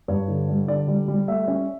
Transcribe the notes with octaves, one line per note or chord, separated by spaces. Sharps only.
G2 C#5
D3
G3
D3 D5
G3
G3
A3 E5
C#4